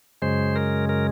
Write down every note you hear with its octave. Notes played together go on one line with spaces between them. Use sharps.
F#2 C#3 G#3 C5
A#4
A#4